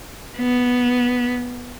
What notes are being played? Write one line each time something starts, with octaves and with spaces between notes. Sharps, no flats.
B3